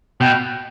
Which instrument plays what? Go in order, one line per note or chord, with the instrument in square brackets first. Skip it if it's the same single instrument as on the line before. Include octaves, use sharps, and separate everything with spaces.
[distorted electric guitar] B2 [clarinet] G5